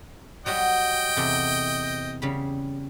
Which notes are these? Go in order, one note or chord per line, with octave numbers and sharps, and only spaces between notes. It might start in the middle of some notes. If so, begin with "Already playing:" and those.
F#3 G3 F#4 D#5 G5
E2 C3 A4
C#3 G3 B5